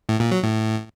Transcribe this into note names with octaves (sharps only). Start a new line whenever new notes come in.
A2
A#2
F#3
A2